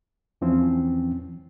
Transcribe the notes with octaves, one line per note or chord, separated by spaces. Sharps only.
E2 E3 F3 C4 C#4